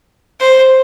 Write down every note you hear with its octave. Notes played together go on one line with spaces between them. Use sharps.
C5